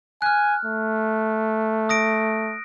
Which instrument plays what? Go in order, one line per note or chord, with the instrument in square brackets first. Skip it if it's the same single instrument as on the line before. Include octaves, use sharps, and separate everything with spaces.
[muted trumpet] G#5 [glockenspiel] F6 F#6
[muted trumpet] A3
[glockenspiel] D#6 A#6 D7